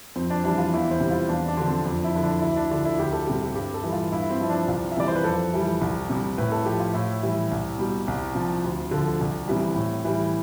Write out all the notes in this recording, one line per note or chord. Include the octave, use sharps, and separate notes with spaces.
F2 C4
D4
E3 G3 D4
F4
E2 E4
C5
C3 G3
F4
E2 D4
D4
D3 F3
C4
F2 D4
E4
D3 F3
D4
D2 E4
D4
D3 F3 D4
E4
D2 G4
A4
C3 G3 G4
G4
G2 G4
A4
E3 G3
F4
G2 E4
C4
F3 E4
D4
C2 F4
E5
C3 E3 G3 D5
C5
B4
F2 A4
E3 G3
C2
C3 G3
A2 B4
A4
F3 G4
F4
A2 E4
E3 G3
C2
B2 G3
C2
C3 F3
D2
D3 F3
C2
C3 E3 G3
A2
E3 G3